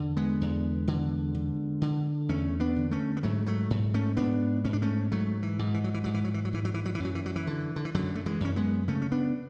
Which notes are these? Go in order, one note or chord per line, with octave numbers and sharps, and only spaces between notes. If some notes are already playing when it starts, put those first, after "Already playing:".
Already playing: E2 D3
G#3 B3
E2
D3
D3
D3
E2 A3 C#4
B3 D4
D3
A3 C#4
B3
G#2 F#3 A3
F#3 A3
G#2
A3 C#4
G#2 B3 D4
G#2 C#4
D4
A3 C#4
G#2 F#3 A3
E3
G#2
E3
F#3
E3
G#2 F#3
E3
F#3
E3
F#3
G#2 E3
F#3
E3
F#3
E3
F#2 F#3
E3
F#3
E3
D3
D3
E3
F#2 D3 F#3
A3
E3 G#3
F#2 C#4
G#3 B3
C#3 A3 C#4
C#4
B3 D4